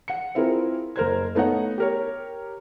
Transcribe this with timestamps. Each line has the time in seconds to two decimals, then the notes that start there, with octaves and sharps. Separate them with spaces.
0.08 F#5 C#7
0.35 C4 E4 F4 G#4 A#4 B4
0.96 F#1 A#4 C5 G#6
1.35 A3 B3 D#4 C#5 F#5
1.78 G4 A#4 C#5